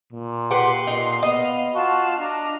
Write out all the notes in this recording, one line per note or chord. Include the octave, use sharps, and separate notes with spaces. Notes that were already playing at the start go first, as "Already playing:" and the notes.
A#2
G4 B4 F#5 C6
A#2 D#4
B3 D#5 F5
F4 F#4 A5
D4 D#5 A#5